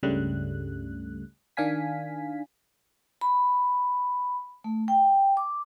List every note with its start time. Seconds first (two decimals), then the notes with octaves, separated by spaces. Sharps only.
0.03 C#2 G2 C#3 G3 A3 F#6
1.57 D#3 D4 F5 G#5 B6
3.21 B5
4.64 A3
4.88 G5
5.37 D6